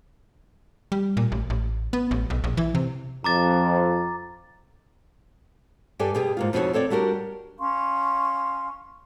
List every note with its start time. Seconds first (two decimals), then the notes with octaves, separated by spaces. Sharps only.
0.92 G3
1.17 A#2
1.32 A1
1.50 A1
1.93 B3
2.11 A1
2.30 B1
2.44 A#1
2.57 E3
2.75 C3
3.24 F2 A#5 D6 A6
5.99 G2 G4 A4 D5 G#5
6.15 B2 G4 G#4
6.37 G#2 A#3 F4
6.53 F2 B2 D#4 F4 F#4 C#5
6.73 C4 A4 C#5 D5
6.90 G3 D4 F#4 G4 A#4
7.59 C#4 F5 C6 C#6